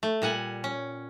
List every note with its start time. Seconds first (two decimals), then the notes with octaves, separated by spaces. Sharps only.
0.03 A3
0.22 A#2 G3 F#5 G#5
0.64 C#4